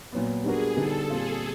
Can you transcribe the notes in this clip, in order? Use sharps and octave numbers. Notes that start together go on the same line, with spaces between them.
A#2 F#3 B3
G3 B3 D4 F#4 G#4 A#4
D3 G3 B3 D#4 A4
A#2 G3 C4 F4 G#4